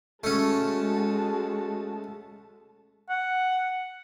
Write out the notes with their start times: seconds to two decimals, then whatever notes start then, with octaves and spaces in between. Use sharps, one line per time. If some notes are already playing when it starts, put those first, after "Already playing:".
0.24 G#3 A3 C#4 F#4 A5
3.09 F#5